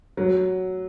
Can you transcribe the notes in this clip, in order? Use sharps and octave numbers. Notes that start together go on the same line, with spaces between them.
F#3